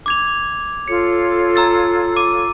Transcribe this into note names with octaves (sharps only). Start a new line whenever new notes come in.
D6 G#6 F7
F4 A4 C#5 C#7
A#5 E6 A6
D6 D#7